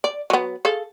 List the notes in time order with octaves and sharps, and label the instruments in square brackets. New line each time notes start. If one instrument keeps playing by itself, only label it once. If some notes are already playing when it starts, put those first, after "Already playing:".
[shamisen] D5
F#3 B3
G#4 A4 F5